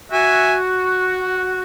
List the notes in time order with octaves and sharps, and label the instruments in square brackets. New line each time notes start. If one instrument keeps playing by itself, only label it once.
[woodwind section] F#4 [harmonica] E5 G#5